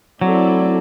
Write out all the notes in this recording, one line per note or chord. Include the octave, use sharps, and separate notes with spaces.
F#3 A3 C4 E4 A4 D5